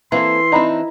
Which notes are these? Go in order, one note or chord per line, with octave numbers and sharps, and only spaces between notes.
E3 A#3 C4 A4 C6
C4 D4 D#4 D#5 A#5 B5